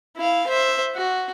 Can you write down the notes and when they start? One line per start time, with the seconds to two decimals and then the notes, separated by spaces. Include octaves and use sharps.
0.17 E4 F5
0.47 C5 E5
0.96 F#4